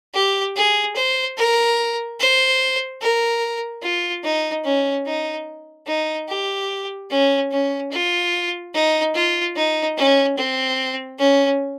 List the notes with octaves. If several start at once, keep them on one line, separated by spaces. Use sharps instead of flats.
G4
G#4
C5
A#4
C5
A#4
F4
D#4
C#4
D#4
D#4
G4
C#4
C#4
F4
D#4
F4
D#4
C#4
C4
C#4